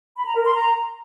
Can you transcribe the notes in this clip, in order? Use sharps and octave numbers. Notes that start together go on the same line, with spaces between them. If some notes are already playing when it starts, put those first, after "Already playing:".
B5
A#5
A#4
C6
A#5